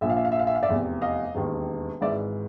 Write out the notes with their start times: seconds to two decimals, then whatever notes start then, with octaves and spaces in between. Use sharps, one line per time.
0.01 A#1 A#2 F3 E5
0.10 F5
0.17 E5
0.25 F5
0.32 E5
0.39 F5
0.47 E5
0.55 F5
0.63 D5 E5
0.68 F1 E2 C3
1.02 D#5 F5
1.35 E1 D#2 D#3
2.01 G#1 G#2 E3 D5 E5